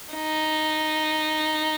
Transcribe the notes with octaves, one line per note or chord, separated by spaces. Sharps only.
D#4